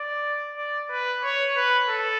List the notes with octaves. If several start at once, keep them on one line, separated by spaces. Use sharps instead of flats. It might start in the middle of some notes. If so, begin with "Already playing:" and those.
Already playing: D5
D5
B4
C#5
B4
A4